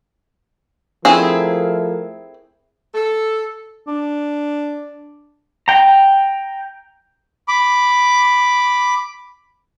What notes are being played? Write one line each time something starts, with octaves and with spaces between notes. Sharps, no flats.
F3 A3 C4 E4 G#4 A#4
A4
D4
G5 A#5
B5 D6